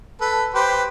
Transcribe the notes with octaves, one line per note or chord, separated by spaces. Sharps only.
A4 B4
G4 B4 C5